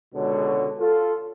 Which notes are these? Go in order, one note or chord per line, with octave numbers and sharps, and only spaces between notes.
C#2 B2 D3 G#3 F#4 C#5
F4 A4